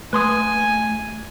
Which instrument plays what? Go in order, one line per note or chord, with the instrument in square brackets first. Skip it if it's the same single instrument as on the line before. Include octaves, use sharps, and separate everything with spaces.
[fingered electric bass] A3 [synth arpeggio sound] B4 C6 D#6 [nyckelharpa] G#5